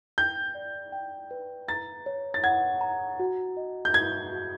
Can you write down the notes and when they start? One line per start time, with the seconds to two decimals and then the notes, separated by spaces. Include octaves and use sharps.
0.18 G5 G6
0.55 D5
0.92 G5
1.31 B4
1.68 A#5 A6
2.06 C#5
2.34 A6
2.43 F#5 G#6
2.81 A#5
3.19 F#4
3.57 D#5
3.85 G6
3.94 F#4 G#6
4.32 F#4